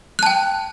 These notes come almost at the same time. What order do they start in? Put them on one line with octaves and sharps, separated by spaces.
F#6 A5 G5